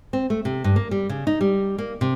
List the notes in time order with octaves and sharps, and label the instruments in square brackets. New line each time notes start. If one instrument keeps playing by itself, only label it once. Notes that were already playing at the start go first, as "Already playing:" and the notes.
[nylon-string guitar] C4
A3
C3
G2
A#3
G3
C#3
D#4
G3
A#3
C3